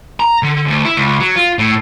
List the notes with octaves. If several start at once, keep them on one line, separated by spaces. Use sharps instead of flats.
A#5
D3
D2
E4
C#2
F#3
F4
A2